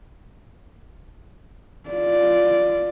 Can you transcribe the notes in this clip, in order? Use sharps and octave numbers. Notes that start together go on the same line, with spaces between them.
F4 D5